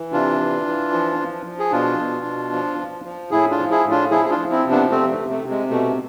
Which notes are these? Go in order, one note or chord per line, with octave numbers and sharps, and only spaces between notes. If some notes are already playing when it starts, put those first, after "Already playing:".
Already playing: E3
C3 D4 F4
E3
E3
F3
F3
F3
G#4
B2 D4 F4
B2
B2
F3
F3
F3
A2 E4 G#4
D4 F4
F3
E4 G#4
A2
D4 F4
F3 E4 G#4
G#4
D4 F4
F3
C4 E4
C3
B3 D4
C3 A3 C4
A3
C3
A3
C3
G#3
B2 A3